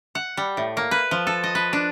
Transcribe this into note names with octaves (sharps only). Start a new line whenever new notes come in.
F#5
G3
A2
A#3
B4
F3
A4
D#5
B4
D4